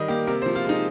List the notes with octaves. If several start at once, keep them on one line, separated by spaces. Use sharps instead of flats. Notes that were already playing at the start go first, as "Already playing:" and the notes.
Already playing: D#3 G3 D#5
A#3 G4
C3 A#4
C5
F3
F4
G#3
D#4